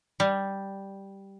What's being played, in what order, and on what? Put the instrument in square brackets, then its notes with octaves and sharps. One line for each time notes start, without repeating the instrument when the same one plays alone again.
[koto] G3